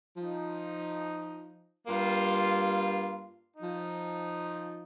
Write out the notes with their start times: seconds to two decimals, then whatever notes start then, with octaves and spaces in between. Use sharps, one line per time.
0.16 F3 D#4
1.87 G2 G3 A#3 F4
3.57 D#4
3.62 F3